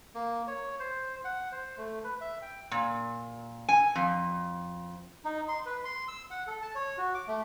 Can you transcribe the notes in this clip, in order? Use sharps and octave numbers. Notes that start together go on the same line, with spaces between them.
A#3
C#5
C5
F#5
C5
A3
B4
E5
G5
A#2
G#5
F2
D#4
C6
B4
C6
E6
F#5
A4
A5
C#5
F#4
D6
A3